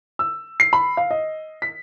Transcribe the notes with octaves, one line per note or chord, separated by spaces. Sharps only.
E6
C7
B5
F5
D#5
B6